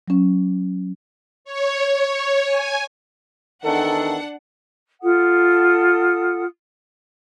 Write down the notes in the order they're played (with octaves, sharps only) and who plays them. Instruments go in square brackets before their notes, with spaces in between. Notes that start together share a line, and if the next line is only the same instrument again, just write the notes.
[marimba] F#3 C#4
[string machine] C#5
C#5
G#5
[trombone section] E2 D#3 A4 [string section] D4 F#5
[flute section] F4 A4 F#5 D#6